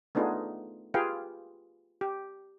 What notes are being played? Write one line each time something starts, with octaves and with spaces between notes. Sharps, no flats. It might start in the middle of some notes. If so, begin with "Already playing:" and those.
A3 B3 D4 D#4 F4 G#4
F4 G4 G#4 B4 F5 G5
G4